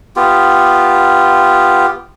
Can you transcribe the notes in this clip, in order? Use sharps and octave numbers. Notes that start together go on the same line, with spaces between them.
B3 F4 G4